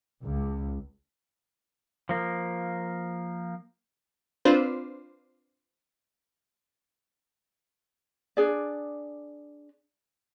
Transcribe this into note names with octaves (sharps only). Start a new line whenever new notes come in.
C#2
F3 A#3
C4 D4 F4 B4 C5
D4 G#4 D5